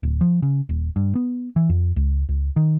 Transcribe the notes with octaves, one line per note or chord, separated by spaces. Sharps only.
D1
F3
C#3
D#1
G2
B3
E3
F2
C#2
C#2
D#3